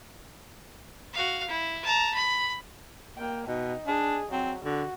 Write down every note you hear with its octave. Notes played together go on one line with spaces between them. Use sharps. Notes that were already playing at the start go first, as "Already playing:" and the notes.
F#4 F5
E4
A5 A#5
B5
A#3 G5
B2 D#4
D4 G#4
F#3 C4
D3 F#4